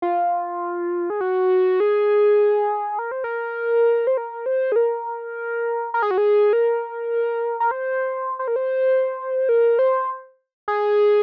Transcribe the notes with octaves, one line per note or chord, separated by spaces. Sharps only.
F4
G#4
F#4
G#4
A#4
C5
A#4
C5
A#4
C5
G#4
A#4
A#4
G#4
F#4
G#4
A#4
A#4
C5
C5
A#4
C5
A#4
C5
G#4